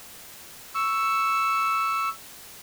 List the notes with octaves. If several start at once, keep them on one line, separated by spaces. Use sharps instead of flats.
C#6 E6